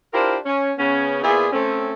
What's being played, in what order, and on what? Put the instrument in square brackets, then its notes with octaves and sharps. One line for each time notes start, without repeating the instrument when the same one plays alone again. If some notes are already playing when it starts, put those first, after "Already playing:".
[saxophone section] D4 E4 F4 G4 A#4 C5
C#4
C#3 B3 C#4
A#2 B3 E4 G#4
A3 C4 C#4